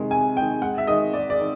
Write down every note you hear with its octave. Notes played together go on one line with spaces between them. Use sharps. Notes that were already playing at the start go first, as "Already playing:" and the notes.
Already playing: C3 D#3 G#3
C3 G#5
D#3 G#3 G5
G#2 F#5
E5
D#3 G#3 D#5
G#2 D5
D5
D#3